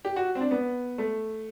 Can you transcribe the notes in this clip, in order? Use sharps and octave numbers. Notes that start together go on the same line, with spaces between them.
G4
F#4
C4
D4
B3
A3